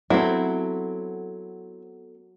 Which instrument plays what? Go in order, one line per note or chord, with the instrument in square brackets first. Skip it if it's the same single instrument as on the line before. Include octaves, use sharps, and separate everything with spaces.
[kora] F#3 [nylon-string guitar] B3 A4 [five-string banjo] C4 E4